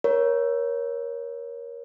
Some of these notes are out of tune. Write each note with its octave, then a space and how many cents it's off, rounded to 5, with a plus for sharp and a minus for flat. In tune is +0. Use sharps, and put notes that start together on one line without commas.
A#4 +25 C#5 +0